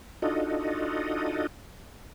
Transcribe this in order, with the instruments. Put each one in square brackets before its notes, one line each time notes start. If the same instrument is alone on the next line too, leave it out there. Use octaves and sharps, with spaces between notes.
[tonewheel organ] D4 D#4 F4 F#4 A4 D#5